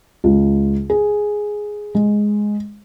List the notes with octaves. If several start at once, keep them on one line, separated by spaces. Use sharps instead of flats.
C#2
G#4
G#3